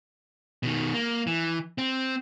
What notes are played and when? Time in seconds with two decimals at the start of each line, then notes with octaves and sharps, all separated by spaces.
0.63 B2 D#3
0.94 A#3
1.27 E3
1.78 C4